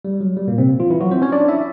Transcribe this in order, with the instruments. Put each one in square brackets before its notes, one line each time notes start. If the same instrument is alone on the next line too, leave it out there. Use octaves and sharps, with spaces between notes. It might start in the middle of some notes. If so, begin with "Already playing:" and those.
[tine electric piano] G3
F#3
G3
A#2 A#3
C3 C4
F3 F4
E3 E4
F#3 F#4
C4 C5
C#4 C#5
D4 D5
E4 E5